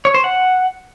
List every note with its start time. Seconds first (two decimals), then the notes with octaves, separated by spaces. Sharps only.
0.05 C#5
0.14 C5
0.24 F#5